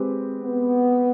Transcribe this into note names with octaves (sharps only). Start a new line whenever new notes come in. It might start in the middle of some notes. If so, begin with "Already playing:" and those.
Already playing: G#3 C4 G4 B4
B3